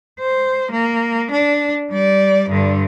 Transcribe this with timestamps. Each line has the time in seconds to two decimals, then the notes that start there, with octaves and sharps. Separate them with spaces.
0.20 C5
0.72 A#3
1.32 D4
1.91 G3 D5
2.50 G2 D3